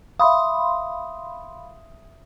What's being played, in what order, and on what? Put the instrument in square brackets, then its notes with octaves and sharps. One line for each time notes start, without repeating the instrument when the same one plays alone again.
[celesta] E5 D#6 [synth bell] F5 B5 C6